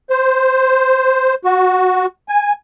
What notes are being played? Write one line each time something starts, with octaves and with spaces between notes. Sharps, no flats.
C5
F#4
G#5